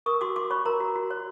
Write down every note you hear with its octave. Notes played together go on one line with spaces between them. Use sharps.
A#4 C#6 D#6
F#4 C6 D6
F#4 C6 D6
C#5 B5 C#6
A#4 A#5 C6
F#4
F#4
C#5